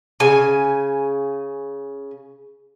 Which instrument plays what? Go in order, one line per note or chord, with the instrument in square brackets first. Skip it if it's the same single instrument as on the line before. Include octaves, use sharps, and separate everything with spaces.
[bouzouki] C#3 G#5